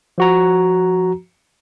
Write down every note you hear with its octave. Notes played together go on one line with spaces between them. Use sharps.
F3 F#4 A#5